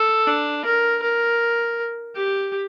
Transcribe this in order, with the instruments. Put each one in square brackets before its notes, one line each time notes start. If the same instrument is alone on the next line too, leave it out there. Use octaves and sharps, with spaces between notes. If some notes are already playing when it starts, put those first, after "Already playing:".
Already playing: [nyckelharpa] A4
D4
A#4
A#4
G4